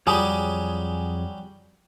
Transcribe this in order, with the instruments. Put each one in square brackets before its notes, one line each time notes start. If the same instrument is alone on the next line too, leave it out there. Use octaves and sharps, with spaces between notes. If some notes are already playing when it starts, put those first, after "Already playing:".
[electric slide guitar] F2 G#4 C#5 [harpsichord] F#3 G3 G4 [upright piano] G#5 D#6